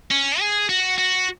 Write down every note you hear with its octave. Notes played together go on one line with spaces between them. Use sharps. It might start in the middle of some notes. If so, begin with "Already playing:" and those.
C#4
G#4
F#4
F#4